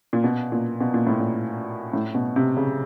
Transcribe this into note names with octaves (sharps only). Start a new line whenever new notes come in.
A#2
B2
A#2
B2
A#2
A2
A#2
A2
B2
C3
C#3